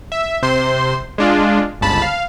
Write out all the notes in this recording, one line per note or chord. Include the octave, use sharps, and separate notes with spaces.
E5
C3 C5 C6
G#3 D4 F4
G1 C#2 A5 B5
F5